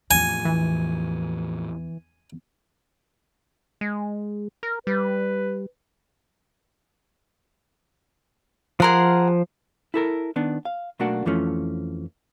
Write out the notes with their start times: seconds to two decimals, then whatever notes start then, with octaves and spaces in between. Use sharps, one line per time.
0.11 E2 A2 F3 G#5
0.45 E3
3.81 G#3
4.63 A#4
4.87 G3 B4
8.80 F3 G#4 A#4 F#5 C6
9.94 E4 A4 A#4
10.36 D#3 B3 D4
10.65 F5
10.99 B1 A3 A#3 D4 F#4 F#5
11.26 F2 E3 F3 A3 C#4